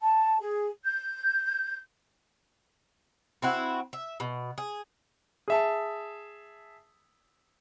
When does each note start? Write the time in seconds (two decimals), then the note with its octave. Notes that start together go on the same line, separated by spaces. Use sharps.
0.02 A5
0.40 G#4
0.85 G6
3.42 C4 E4 F#4
3.93 E5
4.20 B2
4.58 G#4
5.48 G#4 E5 A5